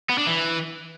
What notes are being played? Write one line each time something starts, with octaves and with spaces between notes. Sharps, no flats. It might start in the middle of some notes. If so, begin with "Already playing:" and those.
B3
D4
E3